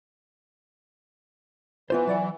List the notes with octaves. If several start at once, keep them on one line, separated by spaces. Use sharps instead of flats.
E3 B3 F4 C5
F#3 D5 F#5